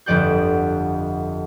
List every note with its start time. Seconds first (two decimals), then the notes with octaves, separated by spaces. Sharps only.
0.06 G1 F2 F3 D5 F#5 G6